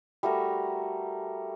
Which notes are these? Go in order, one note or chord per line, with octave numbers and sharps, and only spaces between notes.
G3 A3 F#4 A#4